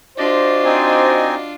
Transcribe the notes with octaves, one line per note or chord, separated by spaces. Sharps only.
D4 F4 F#4 C5 D5 D#5
C4 D#4 G#5